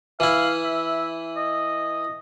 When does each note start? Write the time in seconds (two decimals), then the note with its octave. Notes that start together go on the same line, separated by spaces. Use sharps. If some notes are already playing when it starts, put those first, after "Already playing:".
0.20 E3 E4 F5
0.64 E5
1.37 D#5